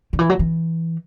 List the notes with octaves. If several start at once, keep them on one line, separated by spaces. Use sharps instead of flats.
D3
E3
F#3
E3